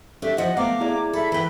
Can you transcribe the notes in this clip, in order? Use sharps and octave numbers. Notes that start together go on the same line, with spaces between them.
A3 D4 G4 E5
E3 F3 D#5 F#5
A3 B3 F5 A#5 D6
E4 G#4 D5
A4 E5 B5
E3 B4 G5 B5